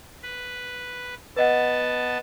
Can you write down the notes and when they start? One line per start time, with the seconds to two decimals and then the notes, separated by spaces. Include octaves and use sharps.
0.23 B4
1.36 B3 B4 D#5 F#5 A5